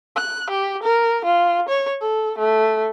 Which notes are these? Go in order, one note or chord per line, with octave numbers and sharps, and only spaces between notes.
F#6
G4
A#4
F4
C#5
A4
A3